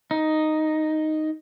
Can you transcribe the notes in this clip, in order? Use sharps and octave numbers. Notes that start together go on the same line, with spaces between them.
D#4